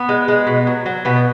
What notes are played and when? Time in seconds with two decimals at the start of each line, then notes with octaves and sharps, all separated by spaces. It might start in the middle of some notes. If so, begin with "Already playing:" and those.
Already playing: B3
0.09 G#3
0.28 G#3
0.47 B2
0.67 F#3
0.86 F#3
1.05 B2 B3